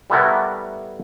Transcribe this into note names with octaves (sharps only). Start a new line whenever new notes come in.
G3 A3 B3 E4 A#4 F#5